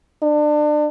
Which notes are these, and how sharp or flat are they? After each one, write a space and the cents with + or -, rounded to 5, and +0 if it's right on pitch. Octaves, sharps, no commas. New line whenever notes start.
D4 +30